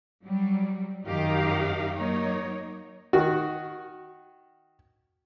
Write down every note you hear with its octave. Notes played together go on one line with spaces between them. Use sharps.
F#3 G3
F#2 D#3 D#4 G4 F5
F#3 A#3 D#4 C#5
D#3 F#4